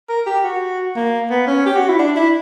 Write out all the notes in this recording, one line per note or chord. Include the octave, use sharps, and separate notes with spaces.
A#4
G4
F#4
A#3
B3
C#4
G4
F#4
E4
D4
E4